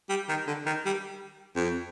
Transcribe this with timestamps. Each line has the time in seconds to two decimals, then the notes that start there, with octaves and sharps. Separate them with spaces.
0.09 G3
0.29 D#3
0.47 D3
0.66 D#3
0.85 G3
1.56 F2